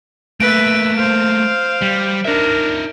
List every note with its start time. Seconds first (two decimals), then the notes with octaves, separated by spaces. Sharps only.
0.40 A3 A#3 B4 E5 D7
0.97 C5 F5
1.82 G3
2.25 D4 D#4 A#4 E5